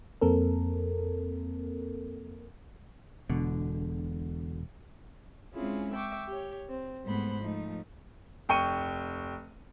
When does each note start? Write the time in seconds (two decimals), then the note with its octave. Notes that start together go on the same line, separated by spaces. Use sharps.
0.21 F2 A#3 C4 A4 A#4
3.29 E1 B2 D3
5.53 G#3 C4 C#4 E4 F4 G#4
5.93 E5 G5 C#6 D6
6.28 G4 C#5
6.69 C4
7.04 G#2 G3 A3 B3 C5 B5
7.39 F3 A3 D#4
8.49 F1 G5 C#6 C#7 D#7